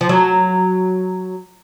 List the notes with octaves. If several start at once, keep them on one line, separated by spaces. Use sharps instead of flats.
F3
F#3